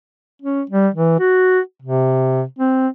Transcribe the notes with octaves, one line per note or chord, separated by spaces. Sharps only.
C#4
G3
E3
F#4
C3
C4